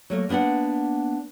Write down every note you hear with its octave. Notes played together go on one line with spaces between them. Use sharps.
F#3 A3 A#3
A#3 B3 D4 D5 F#5